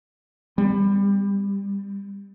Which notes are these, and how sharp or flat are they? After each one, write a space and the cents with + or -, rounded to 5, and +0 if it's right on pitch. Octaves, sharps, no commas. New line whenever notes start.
G3 +25 B3 +40